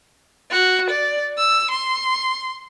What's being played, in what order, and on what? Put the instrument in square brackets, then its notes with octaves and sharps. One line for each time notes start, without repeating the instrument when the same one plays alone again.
[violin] F#4
D5
E6
C6